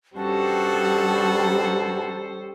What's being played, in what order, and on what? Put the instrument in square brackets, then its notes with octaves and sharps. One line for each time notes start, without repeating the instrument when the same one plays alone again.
[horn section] G2 F#4 [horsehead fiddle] G3 [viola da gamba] C#4 A4 C5 [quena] A5